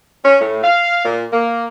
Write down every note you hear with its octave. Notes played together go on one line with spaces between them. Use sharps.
C#4
A2
F5
A#2
A#3